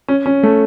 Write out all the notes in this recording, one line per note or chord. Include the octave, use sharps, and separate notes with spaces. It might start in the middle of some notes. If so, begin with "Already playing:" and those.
C#4
C#4
A3